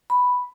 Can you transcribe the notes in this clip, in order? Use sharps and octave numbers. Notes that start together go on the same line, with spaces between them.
B5